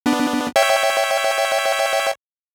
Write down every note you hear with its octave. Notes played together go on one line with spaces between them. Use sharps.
B3 D4
C#5 E5 G5